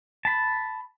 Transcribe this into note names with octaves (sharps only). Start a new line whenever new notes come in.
A5 B5